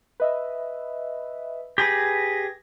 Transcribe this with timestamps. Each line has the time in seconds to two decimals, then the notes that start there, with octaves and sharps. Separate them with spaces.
0.20 B4 D#5 E5
1.78 G4 G#4 B4 G#6 A#6